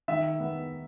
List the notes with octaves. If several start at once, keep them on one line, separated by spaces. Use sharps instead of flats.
D#3 E5
B3